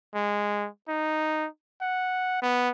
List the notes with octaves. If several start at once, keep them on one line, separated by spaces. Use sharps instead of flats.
G#3
D#4
F#5
B3